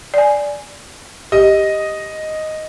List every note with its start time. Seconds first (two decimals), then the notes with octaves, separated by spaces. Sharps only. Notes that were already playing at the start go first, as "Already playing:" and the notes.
0.14 D5 G#5
1.32 G4 D#5